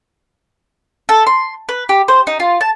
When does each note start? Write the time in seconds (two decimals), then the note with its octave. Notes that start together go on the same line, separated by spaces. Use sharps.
1.09 A4
1.27 C6
1.69 B4
1.89 G4
2.08 C5
2.27 D#4
2.40 F4
2.61 A5